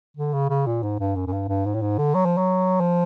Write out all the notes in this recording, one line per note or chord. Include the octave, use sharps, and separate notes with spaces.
D3
C#3
C#3
A#2
G#2
G2
F#2
F#2
G2
G2
G#2
A2
G#2
D3
F#3
F3
F#3
F3